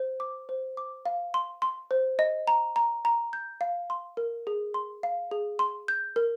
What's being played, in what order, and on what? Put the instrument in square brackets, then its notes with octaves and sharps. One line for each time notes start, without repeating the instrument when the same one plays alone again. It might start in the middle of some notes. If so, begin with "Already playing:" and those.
Already playing: [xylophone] C5
D6
C5
D6
F5
C6
C6
C5
D#5
A#5
A#5
A#5
G6
F5
C6
A#4
G#4
C6
F5
G#4
C6
G6
A#4